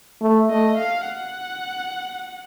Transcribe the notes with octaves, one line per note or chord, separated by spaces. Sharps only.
A3
A3 D#5
F5
F#5